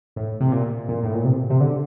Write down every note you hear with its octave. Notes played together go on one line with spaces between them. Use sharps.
A2
C3
A#2
A#2
A2
A#2
C3
C3
D3